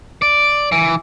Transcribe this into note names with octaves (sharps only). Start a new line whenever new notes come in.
D5
E3